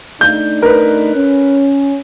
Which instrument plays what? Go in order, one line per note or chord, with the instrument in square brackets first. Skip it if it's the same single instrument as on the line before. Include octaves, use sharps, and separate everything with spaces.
[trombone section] A3 D4 D#4 [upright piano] G6
[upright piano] A#4 B4
[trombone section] C#4